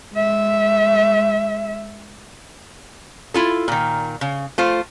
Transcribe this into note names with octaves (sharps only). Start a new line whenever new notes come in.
G#3 E5
E4 F4 A4
A#2 D#3
C#3
A3 F4 C5